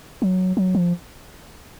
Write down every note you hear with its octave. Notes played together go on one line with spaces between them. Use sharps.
F#3
F#3
F3